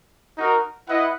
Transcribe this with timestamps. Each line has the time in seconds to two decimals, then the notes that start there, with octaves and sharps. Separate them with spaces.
0.37 D#4 F#4 A#4
0.87 E4 B4 D#5 F#5